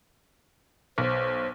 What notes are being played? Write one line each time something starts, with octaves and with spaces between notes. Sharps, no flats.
B1 C5